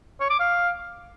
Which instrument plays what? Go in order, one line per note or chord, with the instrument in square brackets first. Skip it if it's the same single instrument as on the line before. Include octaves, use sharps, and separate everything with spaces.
[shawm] C#5
D6
F5